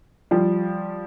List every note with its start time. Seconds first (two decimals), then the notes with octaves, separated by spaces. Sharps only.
0.31 F3 G3